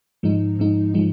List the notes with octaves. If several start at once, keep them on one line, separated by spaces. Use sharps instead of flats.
G#2 F3 G#3 D#4
G#2 F3 G#3 D#4
F3 G#3 D#4